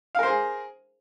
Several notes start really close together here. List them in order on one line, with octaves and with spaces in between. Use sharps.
F5 A#4 C5 G#4